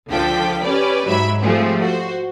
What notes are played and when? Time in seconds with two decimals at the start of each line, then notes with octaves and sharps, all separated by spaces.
0.10 C#2 D3 F3 A4 G5 B6
0.63 C#4 G4 B4 D5
1.07 G#2 F#3 E5 B5
1.41 F3 G3 A3 C4 G#4
1.82 F#4 C5